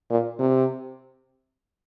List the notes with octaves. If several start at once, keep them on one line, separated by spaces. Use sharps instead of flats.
A#2
C3